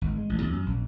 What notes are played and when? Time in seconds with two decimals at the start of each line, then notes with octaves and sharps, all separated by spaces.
0.01 G#1
0.16 G#3
0.29 A1
0.42 D#2
0.53 F#2
0.66 A#1